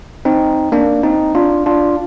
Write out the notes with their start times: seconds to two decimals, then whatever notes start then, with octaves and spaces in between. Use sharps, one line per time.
0.25 C4 D#4
0.72 A#3 D4
1.03 C4 D#4
1.35 D4 F4
1.66 D4 F4